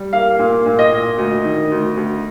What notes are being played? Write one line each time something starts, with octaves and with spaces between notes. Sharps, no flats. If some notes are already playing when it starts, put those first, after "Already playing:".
Already playing: G3
A#3 F5
A#2
A#2
D#5
A#2
D2
D#3
D2
D2